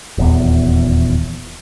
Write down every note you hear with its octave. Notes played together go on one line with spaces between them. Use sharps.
D#1 E2